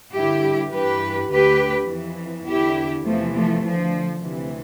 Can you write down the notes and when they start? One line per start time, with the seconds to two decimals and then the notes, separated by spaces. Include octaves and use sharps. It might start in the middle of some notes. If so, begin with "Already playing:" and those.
0.15 G2 D3 E4 G4
0.73 G2 E3 G4 B4
1.31 D2 D3 G4 B4
1.90 F2 E3
2.48 E2 D3 E4 G4
3.05 E2 C3 E3 F3 A3
3.35 F3 A3
3.64 D2 D3 F3
4.22 D2 C3 E3